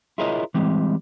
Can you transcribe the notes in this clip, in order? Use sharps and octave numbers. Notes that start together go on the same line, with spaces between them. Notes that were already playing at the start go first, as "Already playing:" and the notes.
E4 F4 G#4 A#4 C#5 D#5
E3 G3 G#3 C4